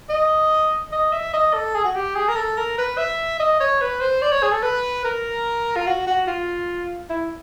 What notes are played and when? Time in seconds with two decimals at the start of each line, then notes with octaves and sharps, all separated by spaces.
0.10 D#5
0.92 D#5
1.13 E5
1.34 D#5
1.54 A4
1.75 G#4
1.85 F#4
1.96 G4
2.16 G#4
2.29 A#4
2.36 A4
2.57 A#4
2.79 B4
2.98 E5
3.40 D#5
3.60 C#5
3.81 B4
4.01 C5
4.22 D5
4.32 C#5
4.43 G#4
4.52 A4
4.63 B4
5.05 A#4
5.77 F4
5.87 F#4
6.07 F#4
6.27 F4
7.10 E4